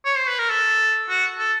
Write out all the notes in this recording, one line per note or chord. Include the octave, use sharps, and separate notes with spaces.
C#5
C5
B4
A#4
A4
F#4
A4